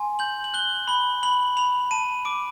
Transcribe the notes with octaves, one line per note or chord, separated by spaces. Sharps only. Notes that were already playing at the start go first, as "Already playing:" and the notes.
Already playing: G#5 C6
G6 F#7
F#7
F#6 G7
B5 G7
B5 F#7
B5 F7
A5 D#7
D6 D7